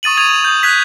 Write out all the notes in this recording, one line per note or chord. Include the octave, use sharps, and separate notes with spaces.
C#6 D#6 A6 D#7 F#7
D#6 G#6 D#7 F7
D#6 G6
F#6 G#6 B6